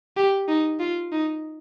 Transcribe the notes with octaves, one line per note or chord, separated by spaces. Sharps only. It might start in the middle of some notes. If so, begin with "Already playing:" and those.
G4
D#4
F4
D#4